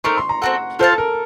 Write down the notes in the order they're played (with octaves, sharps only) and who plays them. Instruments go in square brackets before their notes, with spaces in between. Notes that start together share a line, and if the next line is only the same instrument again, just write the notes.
[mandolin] A3 C4 D#4 A#4 [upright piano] C#6
[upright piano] C6
A#5
[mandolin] C4 F#4 A4 [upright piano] F#5
[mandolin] F4 C5 F5 A5 [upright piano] A4
[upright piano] A#4